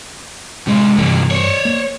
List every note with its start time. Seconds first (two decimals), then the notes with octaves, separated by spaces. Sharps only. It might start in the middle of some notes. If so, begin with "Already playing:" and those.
0.67 C3 G#3
0.98 G2 C3 E3 A#3
1.31 C5 C#5
1.65 A#3